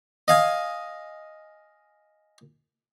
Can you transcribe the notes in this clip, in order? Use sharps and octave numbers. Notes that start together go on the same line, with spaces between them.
D#5 F5 G#5